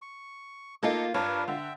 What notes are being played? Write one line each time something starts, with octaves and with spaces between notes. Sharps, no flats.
C#6
A#3 D#4 F4 A4 D#5 D6
G2 D4 F4 A#4 B4 C#5 A5
D3 E5 G5